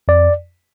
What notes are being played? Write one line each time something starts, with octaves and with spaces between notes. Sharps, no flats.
F2 D5